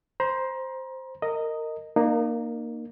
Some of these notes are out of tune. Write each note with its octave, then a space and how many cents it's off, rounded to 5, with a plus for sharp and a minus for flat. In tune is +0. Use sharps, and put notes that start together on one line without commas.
C5 +0 A#5 +35
A#4 -20 D#5 +0
A#3 +0 D#4 -35